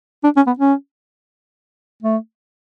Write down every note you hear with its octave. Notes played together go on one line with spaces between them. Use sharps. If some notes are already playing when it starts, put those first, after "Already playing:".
D4
C#4
B3
C#4
A3